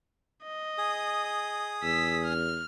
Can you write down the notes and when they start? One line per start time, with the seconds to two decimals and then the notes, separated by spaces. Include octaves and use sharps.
0.44 D#5
0.78 G#4 D#6
1.83 E2 E6 B6
2.24 F6